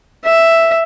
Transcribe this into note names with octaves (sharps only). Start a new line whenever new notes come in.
E5